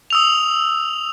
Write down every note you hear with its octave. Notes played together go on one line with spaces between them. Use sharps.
D#6 E6 F7